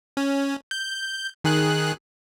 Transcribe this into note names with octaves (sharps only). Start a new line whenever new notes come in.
C#4
G6
D#3 G#4 F#6